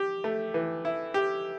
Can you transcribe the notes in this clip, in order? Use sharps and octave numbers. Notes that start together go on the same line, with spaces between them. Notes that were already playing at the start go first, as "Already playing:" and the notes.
Already playing: G4
A3
E3
E4
G4